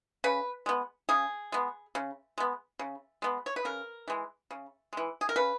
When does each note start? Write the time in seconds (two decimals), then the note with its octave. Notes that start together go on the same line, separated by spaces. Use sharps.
0.24 C#3 B4
0.66 G#3 B3
1.09 C#3 G#4
1.52 G#3 B3
1.95 C#3
2.38 G#3 B3
2.79 C#3
3.22 G#3 B3
3.46 C#5
3.56 B4
3.65 C#3 A#4
4.08 E3 G#3
4.51 C#3
4.93 E3 G#3
5.21 G#4
5.29 A#4
5.36 C#3 B4